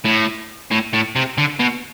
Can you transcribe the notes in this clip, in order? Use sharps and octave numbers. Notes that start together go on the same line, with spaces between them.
A2
A2
A2
C3
D3
B2